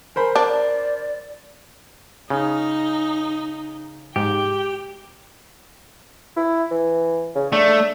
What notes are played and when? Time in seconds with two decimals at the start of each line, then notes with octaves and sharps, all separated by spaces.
0.16 A#4 C5 G#5 B5
0.36 D4 D5
2.30 C#3 D#4
4.16 G#2 G4 G5
6.36 E4
6.71 E3
7.35 C#3
7.52 A3 D4